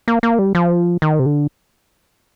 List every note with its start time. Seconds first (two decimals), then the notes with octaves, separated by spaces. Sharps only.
0.08 A#3
0.23 A#3
0.39 G3
0.55 F3
1.02 D#3
1.19 C3
1.26 D3